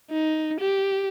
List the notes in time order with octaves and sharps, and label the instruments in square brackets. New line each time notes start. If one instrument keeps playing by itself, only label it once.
[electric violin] D#4
G4